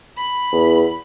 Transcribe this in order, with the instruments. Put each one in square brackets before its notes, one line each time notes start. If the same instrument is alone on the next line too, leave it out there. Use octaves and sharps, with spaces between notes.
[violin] B5
[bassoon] E2